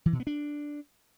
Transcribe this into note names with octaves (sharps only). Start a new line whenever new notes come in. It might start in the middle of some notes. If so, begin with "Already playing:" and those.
E3
B2
B3
D4